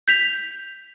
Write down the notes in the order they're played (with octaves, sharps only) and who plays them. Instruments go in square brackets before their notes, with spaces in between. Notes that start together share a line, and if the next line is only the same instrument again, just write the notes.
[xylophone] G6 B6 F7